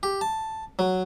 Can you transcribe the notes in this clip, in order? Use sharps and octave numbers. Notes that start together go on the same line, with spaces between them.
G4
A5
F#3